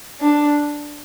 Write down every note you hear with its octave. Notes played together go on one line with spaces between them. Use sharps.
D4